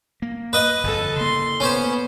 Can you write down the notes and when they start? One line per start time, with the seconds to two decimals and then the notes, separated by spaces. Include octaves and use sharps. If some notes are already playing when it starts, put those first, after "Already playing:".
0.22 A#3
0.53 B4 D#5
0.84 G1 F2 A4 A5
1.16 C#3 A#3 C6
1.60 B3 C#4 C5